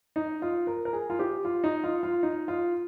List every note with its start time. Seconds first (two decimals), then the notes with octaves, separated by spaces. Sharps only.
0.16 D#4
0.42 F4
0.67 A#4
0.85 A#4
0.93 G#4
1.10 F4
1.19 G4
1.45 F4
1.64 D#4
1.84 F4
2.03 F4
2.23 D#4
2.48 F4